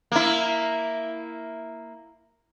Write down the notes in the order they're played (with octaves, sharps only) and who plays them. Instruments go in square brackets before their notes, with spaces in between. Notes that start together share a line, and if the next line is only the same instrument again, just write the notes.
[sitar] A#3 E4